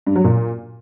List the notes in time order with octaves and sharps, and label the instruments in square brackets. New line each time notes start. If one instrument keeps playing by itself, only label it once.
[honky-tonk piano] G2
F#3
A#2